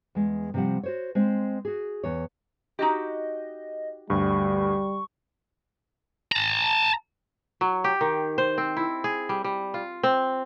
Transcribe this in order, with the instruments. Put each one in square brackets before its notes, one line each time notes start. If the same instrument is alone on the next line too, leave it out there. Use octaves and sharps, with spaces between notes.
[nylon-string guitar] E2 G#3
C3 F3 G3 C4 F#5
F#4 C5 C#5
G#3 C4 C5
F#4 G#4
E2 C#5
[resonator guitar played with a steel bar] D#4 F#4 G4 [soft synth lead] D#5
[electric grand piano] D2 G2 [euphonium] G3 [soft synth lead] C#6
[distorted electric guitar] A5 A#5
[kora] F#3
G4
D#3
C5
C4
E4
G#4
G3
G3
F4
C4